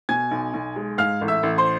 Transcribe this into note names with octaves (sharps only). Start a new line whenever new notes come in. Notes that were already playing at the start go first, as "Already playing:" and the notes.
B2 G#5 G#6
B1
B1
G#3
G#2 F5 F6
A1
E5 E6
A1
C5 C6